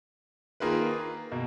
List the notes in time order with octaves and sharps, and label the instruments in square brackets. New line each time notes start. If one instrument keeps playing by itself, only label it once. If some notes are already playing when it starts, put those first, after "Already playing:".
[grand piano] D#3 A#3 F4 G#4 B4
B2 A#3